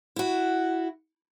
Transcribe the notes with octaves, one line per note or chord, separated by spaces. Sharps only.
E4 F#4